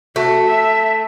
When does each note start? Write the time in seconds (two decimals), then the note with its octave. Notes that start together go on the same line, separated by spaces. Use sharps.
0.16 A3 F#4
0.48 E5